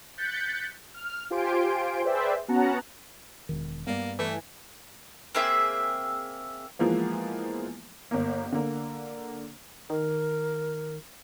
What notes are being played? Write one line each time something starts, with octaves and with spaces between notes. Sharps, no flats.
F#6 G6 A6 B6 C#7
F6
F4 G4 C5 G#5 C6 D7
G#4 B4 C5 D5 E5 G5
B3 C#4 F#4 F#5 A5 A#5
E1 D#3
G2 A#3 B3 D5
E3 A3
A#3 C4 G#4 E5
E3 F3 G#3 A#3 B3
G1 A#3
D3 A#3
D#3 A#4